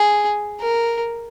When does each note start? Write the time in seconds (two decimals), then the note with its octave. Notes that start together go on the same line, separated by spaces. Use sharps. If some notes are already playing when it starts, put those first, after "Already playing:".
Already playing: G#4
0.61 A#4